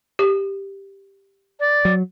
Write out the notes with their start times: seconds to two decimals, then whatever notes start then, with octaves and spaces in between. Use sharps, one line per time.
0.19 G4
1.59 D5
1.85 F#3